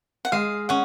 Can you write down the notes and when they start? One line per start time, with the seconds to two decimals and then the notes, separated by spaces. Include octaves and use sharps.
0.25 F#5
0.32 G#3 F5
0.69 C#4 F#5